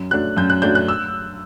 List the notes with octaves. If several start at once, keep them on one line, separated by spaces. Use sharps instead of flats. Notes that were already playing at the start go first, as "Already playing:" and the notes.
Already playing: F#2
F#3 A3 D4 F#6
F#2 G6
F#6
F#3 A3 D4 G6
F#6
E6